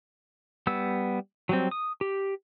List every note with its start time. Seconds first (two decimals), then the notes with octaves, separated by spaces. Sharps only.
0.67 G3 B3 E6
1.49 F#3 G3 C4
1.71 D#6
2.01 G4